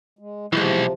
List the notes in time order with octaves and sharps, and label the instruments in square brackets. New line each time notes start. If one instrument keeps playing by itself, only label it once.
[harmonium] G#3
[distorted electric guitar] B1 [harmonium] C3 F3 [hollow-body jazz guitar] E3 G#3